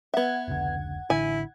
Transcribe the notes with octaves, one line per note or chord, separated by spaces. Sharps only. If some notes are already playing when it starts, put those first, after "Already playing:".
B3 E5 F#5 G#6
F1 C#2 D3
A1 D3 E4 G#5